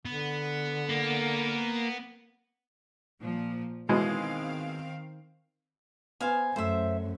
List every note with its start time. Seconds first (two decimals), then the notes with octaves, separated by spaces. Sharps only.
0.05 D3 B3
0.90 A#3
3.20 A#2 F3
3.89 B2 D#3 E3 G#3 C4 F5
6.20 B3 C5 F5 G#5
6.56 F#2 A3 C5 E5